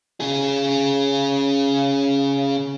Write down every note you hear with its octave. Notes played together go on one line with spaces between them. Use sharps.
C#3 G#4